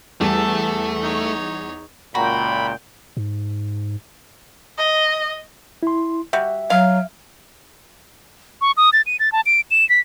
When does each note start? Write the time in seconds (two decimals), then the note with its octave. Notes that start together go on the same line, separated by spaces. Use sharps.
0.21 E2 G3 A3 A5
1.01 D#4 C#5
2.15 C#2 A#2 F#4 G5 A#5 B5
3.17 G#2
4.78 D#5
5.83 E4 C6
6.33 G3 F#4 E5
6.70 F#3 F5
8.61 C#6
8.77 D#6
8.93 A6
9.06 D#7
9.20 A6
9.32 A5
9.46 D7
9.71 E7
9.89 B6